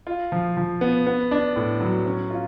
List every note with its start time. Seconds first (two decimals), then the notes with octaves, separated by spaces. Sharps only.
0.07 F4
0.32 F3
0.57 F3
0.81 B3
1.07 B3
1.31 D4
1.56 A2
1.81 F#3
2.06 C#4
2.31 F4